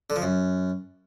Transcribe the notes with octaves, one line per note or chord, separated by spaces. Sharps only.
D3
F3
F#2